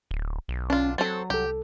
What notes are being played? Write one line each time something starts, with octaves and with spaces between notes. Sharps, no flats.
D1
B1
C#4 D4 F4
F#3 C4 A4 A6
C2 G4 A4